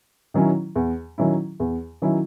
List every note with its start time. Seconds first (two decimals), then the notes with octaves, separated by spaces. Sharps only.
0.34 D#3 F#3 C#4 E4
0.76 E2
1.18 D#3 F#3 C#4 E4
1.60 E2
2.02 D#3 F#3 C#4 E4